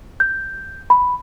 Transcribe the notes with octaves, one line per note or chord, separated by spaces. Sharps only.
G6
B5